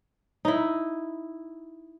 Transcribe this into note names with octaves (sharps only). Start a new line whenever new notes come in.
D#4 E4